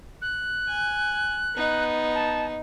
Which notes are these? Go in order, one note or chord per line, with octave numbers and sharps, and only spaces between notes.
F#6
G#5
B3 D#4
A5